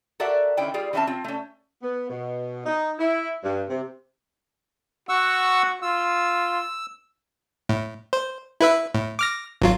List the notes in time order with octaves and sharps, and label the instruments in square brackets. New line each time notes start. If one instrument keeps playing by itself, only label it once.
[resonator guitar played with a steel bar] F#4 A4 A#4 D5 E5 F#5
D3 D#3 C#4 E4 G5
G3 F4 G4 G#4
E3 C4 C#4 E5 A5
C4 F4
A3 C#4
[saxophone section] B3
B2
D#4
E4
G2
C3
[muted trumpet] F#4 [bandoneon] F#5 C#6 E6
[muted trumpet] F4 [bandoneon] E6
[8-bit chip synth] A2
C5
E4 B4 E5
A2
D6 F6 A#6
G#1 F#3 F4